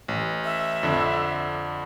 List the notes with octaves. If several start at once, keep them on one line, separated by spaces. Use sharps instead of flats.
A1
E5
F2 D3